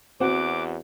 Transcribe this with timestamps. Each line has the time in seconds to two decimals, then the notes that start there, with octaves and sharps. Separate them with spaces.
0.20 E2 C4 F#4 D6